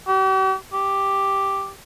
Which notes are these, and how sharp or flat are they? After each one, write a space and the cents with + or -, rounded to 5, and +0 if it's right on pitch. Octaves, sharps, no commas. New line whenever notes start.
G4 -45
G4 +0